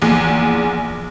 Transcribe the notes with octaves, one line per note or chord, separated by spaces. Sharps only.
A#1 E2 G#4